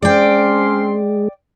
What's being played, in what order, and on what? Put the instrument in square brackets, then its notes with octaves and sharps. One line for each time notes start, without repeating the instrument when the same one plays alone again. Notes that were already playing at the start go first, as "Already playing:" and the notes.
[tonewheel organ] G#3 [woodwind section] C4 C#4 C6 [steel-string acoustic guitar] D5 G5